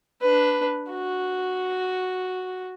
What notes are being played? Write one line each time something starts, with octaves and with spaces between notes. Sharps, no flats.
D4 B4
F#4